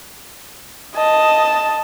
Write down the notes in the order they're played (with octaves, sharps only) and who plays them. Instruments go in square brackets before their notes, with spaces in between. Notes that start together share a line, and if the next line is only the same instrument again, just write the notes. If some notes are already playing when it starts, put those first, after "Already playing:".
[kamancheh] D#5 A5